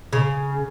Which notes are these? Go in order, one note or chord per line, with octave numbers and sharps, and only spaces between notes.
C#3